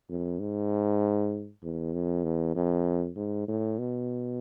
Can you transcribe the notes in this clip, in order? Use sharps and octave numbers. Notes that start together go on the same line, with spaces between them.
F2
G#2
E2
F2
E2
F2
G#2
A2
B2